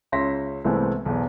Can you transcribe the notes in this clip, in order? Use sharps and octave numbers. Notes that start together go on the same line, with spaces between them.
C#2 C#4 E5 C6 A#6 B6
C2 E3 G#3 A3 B3 C4
B1 E2